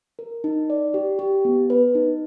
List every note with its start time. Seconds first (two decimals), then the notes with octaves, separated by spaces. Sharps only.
0.19 A#4
0.44 D#4
0.70 D5
0.94 G4
1.19 G4
1.45 B3
1.70 B4
1.95 D#4